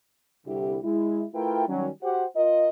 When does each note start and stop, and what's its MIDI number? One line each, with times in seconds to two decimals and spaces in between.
0.46 0.77 36
0.46 0.77 50
0.46 0.77 64
0.46 0.77 67
0.83 1.24 56
0.83 1.24 64
1.34 1.65 57
1.34 1.65 64
1.34 1.65 65
1.34 1.65 70
1.34 1.65 71
1.34 1.65 79
1.67 1.88 51
1.67 1.88 54
1.67 1.88 55
1.67 1.88 61
2.02 2.25 66
2.02 2.25 67
2.02 2.25 72
2.02 2.25 78
2.35 2.69 65
2.35 2.69 70
2.35 2.69 75